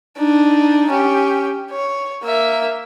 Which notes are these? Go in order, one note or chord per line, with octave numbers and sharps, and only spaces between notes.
D4 D#4
C#4 G4
C#5
A#3 E5